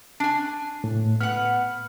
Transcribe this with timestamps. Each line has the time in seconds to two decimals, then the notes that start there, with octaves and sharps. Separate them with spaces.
0.20 D4 G#5
0.84 A2
1.21 B3 F#5 F6